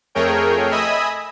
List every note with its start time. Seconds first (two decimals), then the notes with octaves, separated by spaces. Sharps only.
0.15 F2 A3 G#4 A#4 C#5 G5
0.70 D#5 E5 G#5 B5 D#6 E6